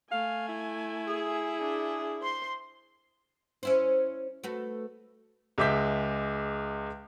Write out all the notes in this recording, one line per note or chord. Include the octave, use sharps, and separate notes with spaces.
A3 F5 G#5
E4
G#4
D4
C5 C6
C#4 E4 C5
A3 F#4 B4
C#2 G#3 E5 D6 G6 B6